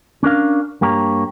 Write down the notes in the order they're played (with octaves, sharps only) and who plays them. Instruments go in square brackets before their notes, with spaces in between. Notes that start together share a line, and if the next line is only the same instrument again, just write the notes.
[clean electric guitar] C#4 D4 A#4 F5
G2 A#3 G4 C#5 A#5